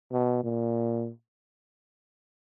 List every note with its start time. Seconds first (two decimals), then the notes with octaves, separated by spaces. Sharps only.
0.12 B2
0.44 A#2